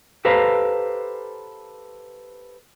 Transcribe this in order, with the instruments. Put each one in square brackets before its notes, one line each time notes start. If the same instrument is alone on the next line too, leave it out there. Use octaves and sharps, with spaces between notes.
[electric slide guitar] G4 A4 B4 C5 F5 A#5